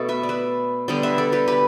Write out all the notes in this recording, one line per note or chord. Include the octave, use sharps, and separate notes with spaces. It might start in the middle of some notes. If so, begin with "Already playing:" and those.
Already playing: B2 A3 A4
B4 E5
D5
B4 E5
D3 G3 B3 D5 G5
B4 E5
A4 D5
G4 B4
G4 B4